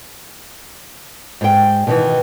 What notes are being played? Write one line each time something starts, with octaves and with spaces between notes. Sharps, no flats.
G#2 G5
B2 D#3 E3